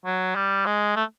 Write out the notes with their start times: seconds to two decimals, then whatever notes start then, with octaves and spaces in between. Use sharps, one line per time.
0.06 F#3
0.35 G3
0.66 G#3
0.96 A3